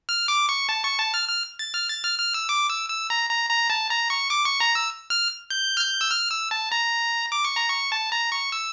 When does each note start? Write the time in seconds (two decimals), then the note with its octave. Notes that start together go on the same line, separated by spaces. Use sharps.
0.09 F6
0.28 D6
0.49 C#6
0.69 A5
0.84 C#6
0.99 A5
1.14 F6
1.29 F6
1.59 A6
1.74 F6
1.89 A6
2.04 F6
2.19 F6
2.34 E6
2.49 D6
2.70 E6
2.89 E6
3.10 A#5
3.30 A#5
3.50 A#5
3.70 A5
3.90 A#5
4.10 C#6
4.30 D6
4.45 C#6
4.60 A#5
4.75 E6
5.10 F6
5.50 G6
5.77 F6
5.81 G6
6.01 E6
6.11 F6
6.31 E6
6.51 A5
6.72 A#5
7.32 D6
7.45 C#6
7.56 A#5
7.70 C#6
7.92 A5
8.12 A#5
8.32 C#6
8.52 E6